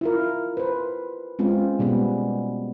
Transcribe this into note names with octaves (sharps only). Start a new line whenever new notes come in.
E4 F4 A#4
B4 C5
G#3 C4 C#4 F4
B2 G3 G#3 B3